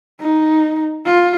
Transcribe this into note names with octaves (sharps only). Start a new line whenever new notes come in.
D#4
F4